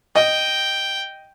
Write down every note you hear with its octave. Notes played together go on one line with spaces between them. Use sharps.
D#5 G5